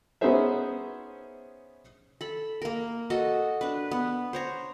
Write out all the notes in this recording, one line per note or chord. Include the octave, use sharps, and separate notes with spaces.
B3 C#4 D#4 G#4 C5 E5
A4 B5
A#3 A#4
F#4 A4 D#5
D4 B4
B3
C5 C#5 A#5